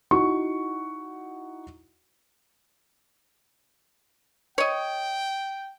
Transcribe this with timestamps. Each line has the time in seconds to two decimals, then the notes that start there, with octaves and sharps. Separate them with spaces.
0.11 D#4 E4 F#4 C#6
4.58 C#5 D#5 G5